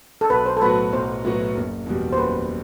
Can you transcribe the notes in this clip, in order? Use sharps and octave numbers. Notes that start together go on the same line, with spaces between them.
A4
B1 B4
C5
A4
A2 F#3 B3 F#4 B4
B1 C5
A2 F#3 B3 F#4
F#1
E2 B2 G3
C5
F#1 B4